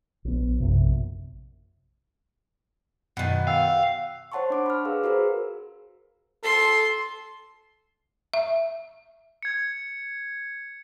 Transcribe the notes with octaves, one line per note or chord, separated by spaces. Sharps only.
A#1 B3
A#1 F#2 C3
F#2 B2 D#3 F#5 A6
F5 G5 E6
C5 C#5 F#5 A5 C6 C#6
D4 D6 D7
B5 F6
G#4 B4 F5 E6
F#4 G#4 A#4 C5
A4 C6
E5
G#6 C#7